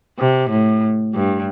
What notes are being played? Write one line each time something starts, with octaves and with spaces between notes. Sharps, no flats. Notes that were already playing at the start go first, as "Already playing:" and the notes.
C3
A2
G2